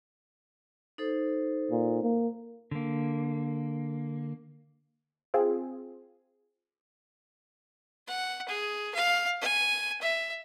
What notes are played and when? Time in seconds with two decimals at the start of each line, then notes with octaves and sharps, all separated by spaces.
0.98 D#4 A4 C5
1.71 A#2
2.03 A#3
2.71 D3 A#3
5.34 C4 F4 G#4
8.07 F#5
8.49 G#4
8.95 F5
9.42 G#5
10.02 E5